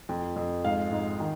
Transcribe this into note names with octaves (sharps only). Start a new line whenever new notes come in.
F2
F2
G#2 F5
G#2
D#3